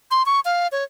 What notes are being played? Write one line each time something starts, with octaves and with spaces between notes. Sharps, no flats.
C6
C#6
F5
C#5